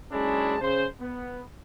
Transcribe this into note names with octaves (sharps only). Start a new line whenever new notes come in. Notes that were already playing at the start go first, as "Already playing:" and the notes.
F#1 G#3 C#4 D4 E4 A5
C#3 C5
B3